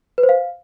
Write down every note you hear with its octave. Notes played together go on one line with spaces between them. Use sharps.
B4
C5
F5